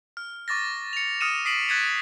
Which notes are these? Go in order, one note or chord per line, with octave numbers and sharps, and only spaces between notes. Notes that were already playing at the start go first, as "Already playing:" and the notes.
F6
C#6 D6 A6 A#6
C#7 F7
D#6 F6 C#7 D#7 E7
D#6 B6 C7 D7 D#7 F#7
F#6 G#6 A6 B6 C#7 D#7